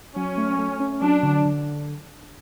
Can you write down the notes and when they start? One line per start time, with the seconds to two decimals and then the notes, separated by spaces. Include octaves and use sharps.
0.16 F#3 C#4
0.37 A3
0.58 A3
0.80 C#4
1.02 F#3 D4
1.23 D3
1.45 D3